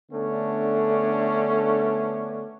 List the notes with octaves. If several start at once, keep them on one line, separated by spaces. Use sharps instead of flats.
D3 A3 B3 C#4 D4